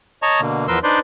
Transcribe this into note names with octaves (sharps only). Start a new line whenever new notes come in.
C#5 D#5 A5 A#5 C#6
B2 D3 A#3
E2 F3 A#4 B4 C6 E6
D4 D#4 B4 C5 D5 C6